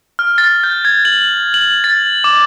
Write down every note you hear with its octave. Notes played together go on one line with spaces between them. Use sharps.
F6
A6
G6
G#6
F#7
F#7
A6
D6